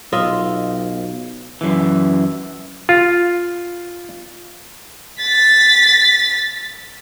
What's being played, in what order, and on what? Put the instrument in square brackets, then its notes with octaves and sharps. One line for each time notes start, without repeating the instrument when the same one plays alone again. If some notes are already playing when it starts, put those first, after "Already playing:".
[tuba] B1 [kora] F4 D#5 E5
[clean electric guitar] F#2 E3
[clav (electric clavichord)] F4
[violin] A6 B6